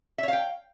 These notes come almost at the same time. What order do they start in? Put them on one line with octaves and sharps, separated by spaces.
E5 C#5 F5 G5